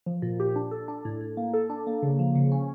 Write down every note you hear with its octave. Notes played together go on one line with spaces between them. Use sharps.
F3
A#2
G4
D4
A4
D4
A2
A2
A#3
A4
D4
A#3
C#3
F3
C#3
C#4